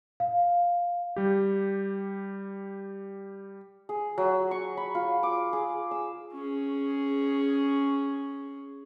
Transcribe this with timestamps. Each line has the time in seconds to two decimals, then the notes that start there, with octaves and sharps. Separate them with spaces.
0.20 F5
1.16 G3 G4
3.89 G#4
4.18 F#3
4.51 C#6
4.77 B5
4.95 F4
5.23 D6
5.53 G#4
5.91 E6
6.34 C#4 G#4